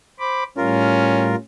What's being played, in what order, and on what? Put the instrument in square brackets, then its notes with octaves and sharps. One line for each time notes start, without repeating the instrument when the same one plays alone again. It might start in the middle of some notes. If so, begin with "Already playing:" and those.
[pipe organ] C5 B5 D6
[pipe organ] A2 G3 [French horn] C#4 [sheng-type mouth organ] F4 A#4